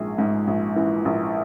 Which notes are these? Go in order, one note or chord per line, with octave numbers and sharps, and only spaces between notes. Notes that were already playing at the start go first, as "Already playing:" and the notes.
Already playing: A#1 G#2 G#4
G#2
A#1
E3
A#1